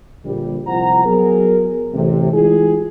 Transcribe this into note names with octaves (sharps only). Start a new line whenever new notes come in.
A#1 D3 G3
C2 F3 F4 C5 F#5 A#5
F#3 B3 G#4 A#4
A1 C3
E3 G#3 E4 F4 G4 G#4